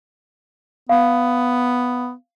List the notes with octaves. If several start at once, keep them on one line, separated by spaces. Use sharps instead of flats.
B3 F5